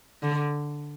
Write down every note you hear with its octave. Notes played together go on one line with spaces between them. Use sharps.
D3